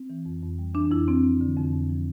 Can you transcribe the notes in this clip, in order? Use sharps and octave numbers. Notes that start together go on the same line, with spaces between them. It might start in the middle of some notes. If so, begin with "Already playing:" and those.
Already playing: C4
E3
F2
F2
G3
E3 D4
F2 E4
F2 C4
F3
D3
F2
F2
F3